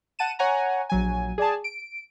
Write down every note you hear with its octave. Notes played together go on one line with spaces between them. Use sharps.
F#5 A5 D#7 E7
C#5 F#5 G#5 A#5
A#1 F#3 G#5
G#4 D5 G#5 A5
D7